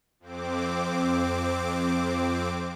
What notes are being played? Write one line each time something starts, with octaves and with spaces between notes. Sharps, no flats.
F2 C4 D6